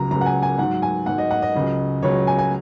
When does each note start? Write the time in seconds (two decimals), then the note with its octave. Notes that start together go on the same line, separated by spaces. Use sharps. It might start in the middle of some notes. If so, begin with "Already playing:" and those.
Already playing: C#2 C#3 F#3 A#5
0.11 C#2 C#3 F#3 A#5
0.21 F#5
0.26 G#5
0.43 G#5
0.58 G#2 F#3 F#5
0.82 G#5
1.06 G#2 F#3 F#5
1.18 D#5
1.31 F#5
1.42 D#5
1.55 C#2 C#3 F#3
2.02 C#2 C#3 F#3 C#5
2.27 G#5
2.38 G#5